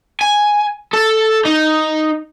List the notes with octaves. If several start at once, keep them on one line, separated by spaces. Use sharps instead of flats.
G#5
A4
D#4